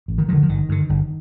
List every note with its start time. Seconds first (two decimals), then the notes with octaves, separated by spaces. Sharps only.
0.08 A1
0.18 D#3
0.29 G2 D3 F3
0.43 F3
0.49 G1 D#3
0.69 G2 D3
0.89 G1